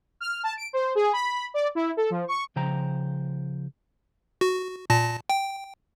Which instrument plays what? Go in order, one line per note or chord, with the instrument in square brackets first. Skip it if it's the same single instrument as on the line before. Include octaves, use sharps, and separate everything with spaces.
[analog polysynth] F6
A5
D7
C5
G#4
B5
D5
E4
A4
F3
C#6
[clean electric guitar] C#3 F3 C5 G5 A#5
[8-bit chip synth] F#4
A#2 A5 A#6
G5